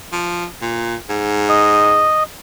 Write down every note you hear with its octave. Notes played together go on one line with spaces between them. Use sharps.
F3
A#2
G#2
D#5